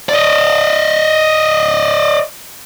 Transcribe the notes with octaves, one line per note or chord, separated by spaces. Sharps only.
D5 D#5